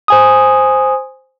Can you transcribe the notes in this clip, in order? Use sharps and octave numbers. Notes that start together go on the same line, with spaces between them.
C5 G#5 D#6